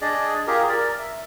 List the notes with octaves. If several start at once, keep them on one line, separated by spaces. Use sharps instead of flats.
D4 G#4 D5 D#5
F4 G4 G#4 A#4
A#4 D5
E5